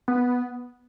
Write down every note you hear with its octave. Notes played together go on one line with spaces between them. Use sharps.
B3